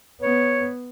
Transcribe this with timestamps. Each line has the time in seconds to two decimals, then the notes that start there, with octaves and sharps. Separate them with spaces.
0.21 B3 C#5